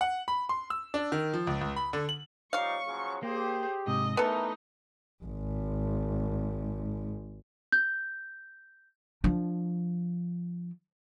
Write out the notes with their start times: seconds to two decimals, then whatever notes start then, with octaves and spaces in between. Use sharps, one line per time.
0.01 F#5
0.28 B5
0.49 C6
0.70 E6
0.94 D4
1.12 D#3
1.34 F3
1.47 C#2
1.61 C#2
1.76 B5
1.93 D3
2.09 F#7
2.53 F3 G3 D#4 C#5 F5 C#6
2.86 C#3 F3 F#3
3.23 A#3 G4 G#4 C5
3.87 G#2 C3 D#5
4.17 E3 A3 B3 D#4 A4 A#4
5.24 G#1 G#2
7.72 G6
9.24 F3 D4